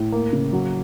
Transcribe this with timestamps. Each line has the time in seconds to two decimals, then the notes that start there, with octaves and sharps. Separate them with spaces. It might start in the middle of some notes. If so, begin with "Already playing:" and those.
Already playing: A2
0.12 A#3
0.33 C#3
0.53 F#3